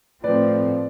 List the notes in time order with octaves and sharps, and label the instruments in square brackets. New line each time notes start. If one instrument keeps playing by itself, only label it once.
[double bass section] A2 F3 A3 C4 [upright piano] B4 D5